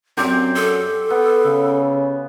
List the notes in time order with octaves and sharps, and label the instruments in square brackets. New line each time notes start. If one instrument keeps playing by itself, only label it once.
[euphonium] F#2 [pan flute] C4 [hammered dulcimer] G4 C5 D5
[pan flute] A4
[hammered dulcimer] B3 [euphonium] B4
[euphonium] C#3